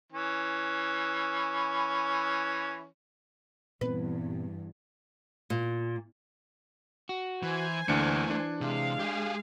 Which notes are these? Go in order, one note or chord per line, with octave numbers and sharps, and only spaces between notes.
E3 C#4
E2 G2 A#2 B3 C4 B4
A#2
F#4
E3 C5 G#5
D2 E3 A3 A#3 D4 C#7
D4
C3 G#3 F5
G4 G#4